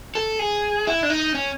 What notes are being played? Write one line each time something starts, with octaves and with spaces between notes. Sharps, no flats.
A4
G#4
E4
D4
D#4
C#4